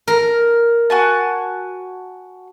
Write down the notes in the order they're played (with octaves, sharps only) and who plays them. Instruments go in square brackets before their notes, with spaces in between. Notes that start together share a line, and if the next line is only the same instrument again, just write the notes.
[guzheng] A#4
[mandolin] F#4 G#5 A5